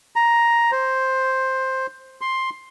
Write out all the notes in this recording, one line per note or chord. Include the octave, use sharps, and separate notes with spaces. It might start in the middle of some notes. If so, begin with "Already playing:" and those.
A#5
C5
C6